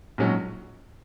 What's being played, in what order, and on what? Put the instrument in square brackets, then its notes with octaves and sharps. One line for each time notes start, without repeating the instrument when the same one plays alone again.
[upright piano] A#1 G#2 F#3 C#4 F#4